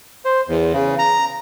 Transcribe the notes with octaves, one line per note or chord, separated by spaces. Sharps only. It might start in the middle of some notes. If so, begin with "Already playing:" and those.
C5
E2
C#3
A#5